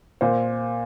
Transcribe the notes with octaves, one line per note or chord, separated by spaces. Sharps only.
A#2 C5